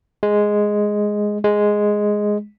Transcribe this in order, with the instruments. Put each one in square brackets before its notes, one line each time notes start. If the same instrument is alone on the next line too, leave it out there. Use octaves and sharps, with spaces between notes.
[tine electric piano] G#3
G#3